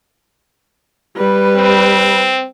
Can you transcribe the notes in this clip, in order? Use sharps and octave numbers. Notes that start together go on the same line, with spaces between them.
G3 B4
C4